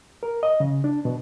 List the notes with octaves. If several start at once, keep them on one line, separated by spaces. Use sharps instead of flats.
A#4
D#5
C#3
D4
B2